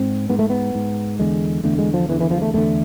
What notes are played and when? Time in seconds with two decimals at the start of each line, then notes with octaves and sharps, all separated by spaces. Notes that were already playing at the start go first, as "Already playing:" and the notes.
Already playing: G#2 C4
0.30 G#2 B3
0.39 A3
0.50 B3
0.75 G#2
1.19 E2 D3 G#3
1.64 E2 D3 A3
1.78 G#3
1.94 F3
2.09 E2 D3 E3
2.21 E3
2.31 F3
2.42 A3
2.54 E2 D3 A3